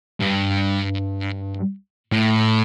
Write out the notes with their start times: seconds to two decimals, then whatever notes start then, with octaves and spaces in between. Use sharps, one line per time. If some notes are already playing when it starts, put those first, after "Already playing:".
0.21 G2
2.12 A2